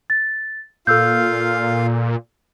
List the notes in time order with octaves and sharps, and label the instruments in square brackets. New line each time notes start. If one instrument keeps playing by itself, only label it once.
[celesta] A6
[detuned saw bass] A#2 [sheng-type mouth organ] F4 F5 [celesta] A4 E6 G6